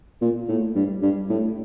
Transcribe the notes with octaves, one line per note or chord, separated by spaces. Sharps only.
A#2
A2
G2
G2
A2